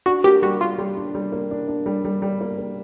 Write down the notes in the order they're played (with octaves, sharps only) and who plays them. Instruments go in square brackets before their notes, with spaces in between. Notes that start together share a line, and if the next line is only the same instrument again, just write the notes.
[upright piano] D4 [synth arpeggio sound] F#4
[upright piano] A#3 [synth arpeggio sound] G4
[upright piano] G3 [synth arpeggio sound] F#4
[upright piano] A#3 [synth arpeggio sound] F4
[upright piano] G3
D4
G3
A#3
D4
D4
G3
G3
G3
A#3
A#3